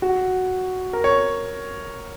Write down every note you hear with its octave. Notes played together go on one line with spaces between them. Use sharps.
F#4
A#4
C#5